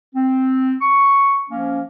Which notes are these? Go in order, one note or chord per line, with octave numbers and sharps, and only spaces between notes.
C4
C#6
F3 A#3 C#4